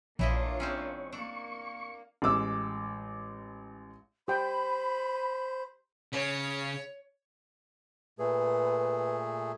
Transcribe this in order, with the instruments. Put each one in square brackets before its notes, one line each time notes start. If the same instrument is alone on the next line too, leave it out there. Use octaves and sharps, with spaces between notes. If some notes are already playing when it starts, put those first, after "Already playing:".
[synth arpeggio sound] A#1 [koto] E3 E4 D#5 [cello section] A#3 D4 F4 [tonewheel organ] C#5
[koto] G#3 C4 C#4
[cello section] A#3 [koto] D4 [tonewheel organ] C#6
[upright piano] A1 G#3 D6 E6
[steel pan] G4 G5 [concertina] C5 [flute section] B5
[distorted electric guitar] C#3 [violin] C#5
[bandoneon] A#2 A3 G#4 [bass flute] B4